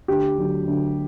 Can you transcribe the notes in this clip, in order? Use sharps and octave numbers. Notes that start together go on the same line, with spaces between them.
D2 G4
D3 F#3
D2